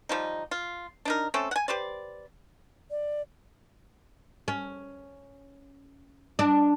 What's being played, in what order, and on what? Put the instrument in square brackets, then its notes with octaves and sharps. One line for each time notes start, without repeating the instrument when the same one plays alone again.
[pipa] F3 G3 D#4
F4
D4 D#4 A#4
A3 C4 C#4 A4
F#5 G#5
G4 B4 C5 D5
[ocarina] D5
[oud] C#4
D4